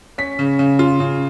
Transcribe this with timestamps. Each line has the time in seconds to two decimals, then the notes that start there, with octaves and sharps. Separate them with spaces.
0.18 C#4 B6
0.39 C#3
0.59 C#3
0.79 F4
1.00 C#3